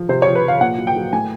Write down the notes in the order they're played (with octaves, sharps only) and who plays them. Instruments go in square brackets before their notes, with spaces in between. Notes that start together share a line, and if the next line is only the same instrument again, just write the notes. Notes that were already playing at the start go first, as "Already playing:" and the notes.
Already playing: [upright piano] F3
C3 C5
C#5
F3
B4
F3
F5
A#2 F#5
F#3
G5
F#3
A2 G#5